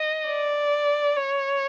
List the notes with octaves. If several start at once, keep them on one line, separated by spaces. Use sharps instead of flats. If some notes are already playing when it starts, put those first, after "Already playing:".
Already playing: D#5
D5
C#5